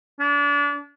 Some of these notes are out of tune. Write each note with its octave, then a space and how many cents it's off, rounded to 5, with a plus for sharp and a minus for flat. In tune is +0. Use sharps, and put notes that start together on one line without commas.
D4 -30